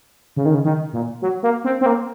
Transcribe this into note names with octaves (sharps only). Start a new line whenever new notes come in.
C#3
D#3
C#3
D#3
A#2
F#3
A#3
C4
C4
A#3